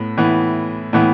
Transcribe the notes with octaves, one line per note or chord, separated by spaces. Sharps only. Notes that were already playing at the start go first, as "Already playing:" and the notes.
Already playing: A2 B3
A2 E3 B3
A2 E3 B3